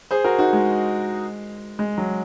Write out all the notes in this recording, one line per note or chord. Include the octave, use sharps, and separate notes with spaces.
G#4 C5
F#4 A#4
D#4 F#4
G#3
G#3
F#3